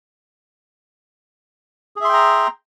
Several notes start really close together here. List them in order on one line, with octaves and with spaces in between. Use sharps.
G#4 E5 C6 G5 A#5